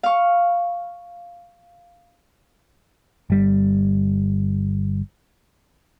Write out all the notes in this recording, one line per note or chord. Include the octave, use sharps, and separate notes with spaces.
F5 C#6
G1 G3